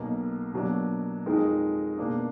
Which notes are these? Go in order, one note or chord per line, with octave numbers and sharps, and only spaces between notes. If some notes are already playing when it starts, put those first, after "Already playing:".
Already playing: B1 B2 A#3
B2 F#3 A#3 D4
F2 F3 G#3 D#4 A#4
B2 A#3 D4